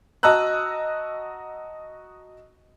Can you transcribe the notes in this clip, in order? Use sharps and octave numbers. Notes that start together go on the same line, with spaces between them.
F#4 D#5 A5 A#5 E6 F#6